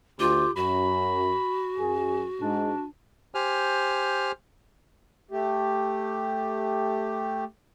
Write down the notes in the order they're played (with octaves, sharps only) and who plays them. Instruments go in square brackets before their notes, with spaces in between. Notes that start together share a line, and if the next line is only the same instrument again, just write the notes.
[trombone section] D2 [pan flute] F4 [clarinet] G4
[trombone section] F#2 [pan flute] F#4 [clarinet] B5
[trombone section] F#2 G#4
[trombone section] G#2 [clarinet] D4
[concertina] G4 C5 G#5 F6
[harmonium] A3 G4